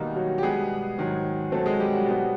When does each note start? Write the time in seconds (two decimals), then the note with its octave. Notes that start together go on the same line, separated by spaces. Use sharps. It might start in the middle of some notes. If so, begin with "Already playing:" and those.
Already playing: B2 D#3 G3 A#3 D#4
0.16 F#3 F#4
0.38 G4
0.43 B2 G3 G#3 B3 G#4
0.98 G#2 D#3 F#3
1.52 B2 F#3 A3 C4 A4
1.66 G#3 G#4
1.80 G3 G4
1.93 F#3 F#4
2.07 B2 G3 B3